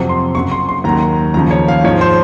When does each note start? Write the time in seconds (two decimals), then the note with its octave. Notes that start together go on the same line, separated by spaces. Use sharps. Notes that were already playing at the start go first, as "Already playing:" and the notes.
Already playing: F2 C3 F#3
0.09 C6
0.35 F#2 C#3 F#3 C#6
0.51 C6
0.69 C6
0.84 D#2 D#3 F#3 A#5
1.34 D#2 C#3 F3 A#5
1.51 C#5
1.68 F5
1.84 G#2 F3 C#5
2.01 C5